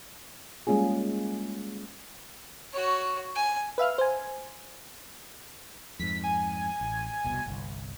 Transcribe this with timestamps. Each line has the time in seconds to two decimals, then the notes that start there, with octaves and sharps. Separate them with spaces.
0.67 G3 G#3 A#3 C#4 F4 G#4
2.73 F#4 C#5
3.35 G#5
3.78 B4 E5 F5 F6
3.98 C5 G#5
5.99 F2 G#2 B6
6.24 G#5
6.81 A1
7.24 E1 C2 B2
7.46 G1 C2